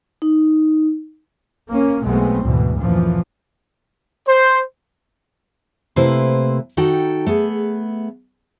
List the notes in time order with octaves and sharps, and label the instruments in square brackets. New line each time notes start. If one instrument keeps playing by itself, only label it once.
[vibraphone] D#4
[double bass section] A#3 C#4
B1 G#3 A3 B3 C4
D2 G#2 B2 E3
F#2 A#2 E3 F3
[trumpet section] C5
[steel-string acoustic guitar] C3 A3 A#3 E4 B4 C5
D#3 D#4 F#4 A4 G5
A3 B3 G#4